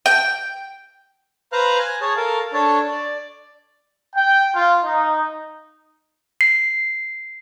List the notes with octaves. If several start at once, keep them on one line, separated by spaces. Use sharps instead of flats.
G5
B4 C5 F5 A#5 F6 F#6
G#5
G#4 C#5 A5
A4 A#4 F5
D4 A4 C#5 A5
D5
G5
F4
D#4
C7